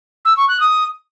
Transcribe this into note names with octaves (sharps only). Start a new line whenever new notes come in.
E6
C#6
F#6
D#6